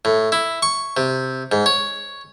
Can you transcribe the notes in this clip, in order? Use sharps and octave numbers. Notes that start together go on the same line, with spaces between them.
A2
E4
C#6
C3
G#2
C#5